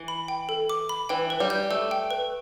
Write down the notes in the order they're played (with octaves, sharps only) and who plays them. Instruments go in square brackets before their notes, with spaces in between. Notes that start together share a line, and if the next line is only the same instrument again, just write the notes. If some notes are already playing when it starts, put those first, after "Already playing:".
Already playing: [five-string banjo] E3
[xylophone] B5
G5
A4
D6
B5
[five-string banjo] E3 [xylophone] G5
[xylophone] B4
[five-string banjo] G3
[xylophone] G6
[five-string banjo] A3 [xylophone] E6
[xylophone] G5
B4